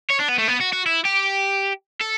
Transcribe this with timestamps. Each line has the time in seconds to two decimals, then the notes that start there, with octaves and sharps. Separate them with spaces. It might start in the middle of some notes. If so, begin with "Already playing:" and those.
0.10 C#5
0.20 D4
0.29 B3
0.39 A3
0.48 B3
0.61 F#4
0.73 F#4
0.86 E4
1.05 G4
2.01 A4